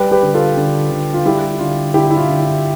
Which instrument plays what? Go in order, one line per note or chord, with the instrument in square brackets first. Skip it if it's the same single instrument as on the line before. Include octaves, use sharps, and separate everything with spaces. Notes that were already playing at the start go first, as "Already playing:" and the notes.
Already playing: [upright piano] G3 G4 B4
G4 B4
D3
F4 A4
D3
D3
F4
G3 E4 G4
D3 F4
D3 E4 G4
E4
F4
D3
E4